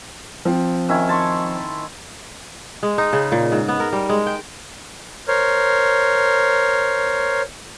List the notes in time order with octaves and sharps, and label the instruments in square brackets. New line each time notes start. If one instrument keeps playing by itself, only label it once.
[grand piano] F3 C4
[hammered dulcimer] D#3 C#4 E4
A5 C6 C#6
[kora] G#3
D#4
C#3
A#2
G#2
B3
A#4
G3
G#3
G5
[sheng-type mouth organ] A#4 C5 C#5